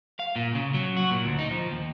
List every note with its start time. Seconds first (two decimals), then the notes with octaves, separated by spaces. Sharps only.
0.19 F5
0.36 A#2
0.55 C#3
0.74 F#3
0.97 F#4
1.11 A#2
1.25 D2
1.39 D#4
1.51 F3
1.71 D#2